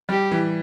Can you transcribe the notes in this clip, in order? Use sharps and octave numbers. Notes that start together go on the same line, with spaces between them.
G3 G4
E3